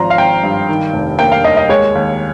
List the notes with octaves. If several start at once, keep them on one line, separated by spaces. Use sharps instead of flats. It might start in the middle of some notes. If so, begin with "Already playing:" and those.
Already playing: G#1 F3 A#5 C6
F5
G#1 G5
G2
D#3
F1
A#3 G5
F5
D#2 D#5
D#5
G#3 C#5
D#2